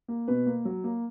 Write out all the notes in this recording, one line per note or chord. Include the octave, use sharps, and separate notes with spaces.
A#3
B2 B4
A#3
F#3
A#3